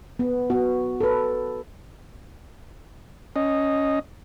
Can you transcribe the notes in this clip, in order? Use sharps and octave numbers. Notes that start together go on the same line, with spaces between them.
B3
B3 F#4
A4 B4
C#4 D#5